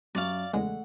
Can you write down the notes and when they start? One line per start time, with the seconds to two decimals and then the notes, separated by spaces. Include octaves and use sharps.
0.15 F#2 D5 F5 C#6 F7
0.53 E2 C#3 G#3 A3 F#5